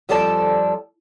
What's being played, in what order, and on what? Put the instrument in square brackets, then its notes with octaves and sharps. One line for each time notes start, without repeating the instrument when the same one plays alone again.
[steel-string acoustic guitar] F2 F3 G3 A4 D5 A5